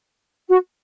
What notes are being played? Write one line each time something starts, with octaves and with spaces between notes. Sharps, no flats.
F#4